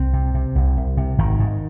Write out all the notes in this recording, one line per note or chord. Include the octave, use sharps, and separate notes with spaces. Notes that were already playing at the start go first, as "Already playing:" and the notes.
Already playing: C2 C4
C3
C3
C2
C2
C3
G#1 D#3
G#2